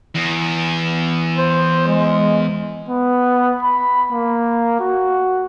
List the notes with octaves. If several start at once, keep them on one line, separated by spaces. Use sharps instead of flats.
E2
C5
G#3
B3
B5
A#3
F#4